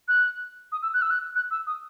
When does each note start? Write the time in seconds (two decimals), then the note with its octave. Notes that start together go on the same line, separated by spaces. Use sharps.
0.08 F#6
0.72 D#6
0.82 E6
0.93 F#6
1.02 E6
1.10 F#6
1.35 F#6
1.51 E6
1.67 D#6